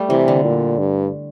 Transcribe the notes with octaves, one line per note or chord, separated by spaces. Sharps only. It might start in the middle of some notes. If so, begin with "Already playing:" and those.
Already playing: G3 A3
C3 E3
D3
A#2
G2